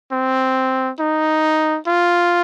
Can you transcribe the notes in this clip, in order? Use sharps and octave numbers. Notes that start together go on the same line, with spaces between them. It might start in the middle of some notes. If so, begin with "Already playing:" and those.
C4
D#4
F4